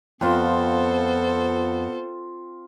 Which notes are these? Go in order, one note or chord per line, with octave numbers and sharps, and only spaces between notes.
F2 B3 C4 F4 A4 C5